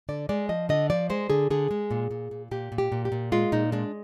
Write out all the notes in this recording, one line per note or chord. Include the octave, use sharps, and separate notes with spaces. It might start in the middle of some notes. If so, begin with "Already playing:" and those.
D3 D5
G#3 D5
F3 D#5
D3 D#5
F3 D5
G#3 C5
D3 G#4
D3 G#4
G#3
A#2
A#2
A#2
A#2 G4
A#2
G4
A#2
G4
A#2
G#3 F4
A#2 D#4
G#3 D4